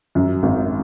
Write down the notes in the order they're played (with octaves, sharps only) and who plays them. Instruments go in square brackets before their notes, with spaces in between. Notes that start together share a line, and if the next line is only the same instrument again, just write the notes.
[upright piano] F#2
G#1